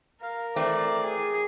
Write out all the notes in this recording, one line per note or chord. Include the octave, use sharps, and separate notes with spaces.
A#4 F5
E3 A3 C4 D5
G#4